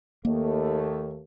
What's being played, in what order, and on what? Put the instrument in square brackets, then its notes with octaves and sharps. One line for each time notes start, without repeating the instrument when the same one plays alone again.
[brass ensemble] D#2 A3 [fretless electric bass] A#3